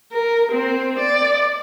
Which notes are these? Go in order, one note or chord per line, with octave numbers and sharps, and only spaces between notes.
A#4
C4
D5